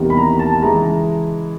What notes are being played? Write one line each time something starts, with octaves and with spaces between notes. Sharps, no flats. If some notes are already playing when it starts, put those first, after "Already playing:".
Already playing: E2 C3 D#3 G3 A#3
B5
A#5
A5
C#3 E3 G#3 A#5